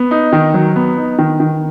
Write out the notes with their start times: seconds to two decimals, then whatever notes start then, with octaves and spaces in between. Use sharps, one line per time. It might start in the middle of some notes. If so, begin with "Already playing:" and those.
Already playing: B3
0.11 D#4
0.33 D#3
0.54 F#3
0.76 B3
0.97 D#4
1.19 D#3
1.40 D#3